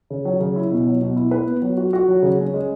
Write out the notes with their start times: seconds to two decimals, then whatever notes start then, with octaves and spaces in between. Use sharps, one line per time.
0.10 C#3
0.25 F#3
0.40 C#3
0.56 E4
0.71 B2
0.87 F#3
1.01 B2
1.17 E4
1.31 B4
1.47 B3
1.62 F#3
1.77 F#4
1.93 F#4
2.08 F#3
2.23 C#3
2.38 C#4
2.54 G#3